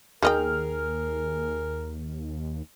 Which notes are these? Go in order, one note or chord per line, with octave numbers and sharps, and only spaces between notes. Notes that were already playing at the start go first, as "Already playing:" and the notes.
D#2 D#3 G#4 A#4 D#5 G5 F6